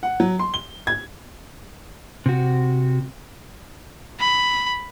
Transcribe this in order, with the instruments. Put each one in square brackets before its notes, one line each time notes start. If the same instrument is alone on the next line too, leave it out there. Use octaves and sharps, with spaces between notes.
[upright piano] F#5
F#3
C6
G7
G#6
[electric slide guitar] C3 F#4
[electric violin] B5